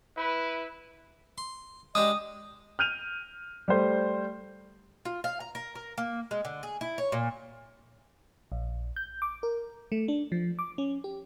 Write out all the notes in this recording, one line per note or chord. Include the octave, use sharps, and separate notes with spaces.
E4 B4
C6
G#3 D4 G4 D#5 D#6
F6 G6 D#7 F7
G3 A3 C5
F4
F5
A#5
A#4
A#4
A#3
G#3
D3
G#4
E4
C#5
A#2
A#1
G6
D6
A#4
A3
D4
F3
D6
C#4
G4